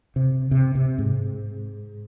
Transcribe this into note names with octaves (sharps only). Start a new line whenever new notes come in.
C3
C3
C3
G#2